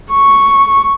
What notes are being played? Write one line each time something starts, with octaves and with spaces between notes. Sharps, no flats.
C#6